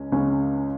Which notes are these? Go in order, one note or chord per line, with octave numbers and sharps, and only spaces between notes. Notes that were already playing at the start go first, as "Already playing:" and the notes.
Already playing: C#2 C#3 G#3 C#4
C#2 C#3 G#3 C#4